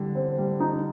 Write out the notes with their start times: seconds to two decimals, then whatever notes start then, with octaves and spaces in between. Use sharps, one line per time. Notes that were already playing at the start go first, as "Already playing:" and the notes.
Already playing: D3 E3 G3
0.15 C4
0.38 G3
0.60 D#4